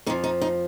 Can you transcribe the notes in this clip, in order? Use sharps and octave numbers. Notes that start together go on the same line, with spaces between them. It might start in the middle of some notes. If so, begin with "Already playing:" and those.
F2 F3 D#4
D#4
D#4